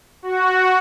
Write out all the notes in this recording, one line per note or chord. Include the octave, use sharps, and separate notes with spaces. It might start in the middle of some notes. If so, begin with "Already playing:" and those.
F#4